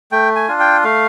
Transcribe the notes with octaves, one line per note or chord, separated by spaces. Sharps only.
A3 G5
G#5
D4 F4
G5
A3 F5